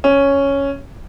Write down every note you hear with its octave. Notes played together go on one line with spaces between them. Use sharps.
C#4